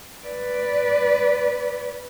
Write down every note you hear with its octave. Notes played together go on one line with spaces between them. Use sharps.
B4 D5